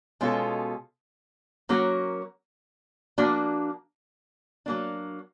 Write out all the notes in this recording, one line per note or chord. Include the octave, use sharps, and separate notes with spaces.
B2 G#3 C#4 F4 A4
F#3 A#3 C#4 F#4 A#4
F3 A#3 D4 F#4
F#3 A#3 D4